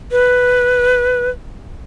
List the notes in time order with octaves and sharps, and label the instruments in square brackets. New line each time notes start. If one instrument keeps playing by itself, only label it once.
[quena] B4